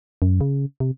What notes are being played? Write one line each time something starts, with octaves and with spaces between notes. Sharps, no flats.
F#2
C#3
C3